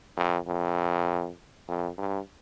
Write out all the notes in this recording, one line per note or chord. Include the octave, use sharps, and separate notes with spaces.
F2
F2
F2
G2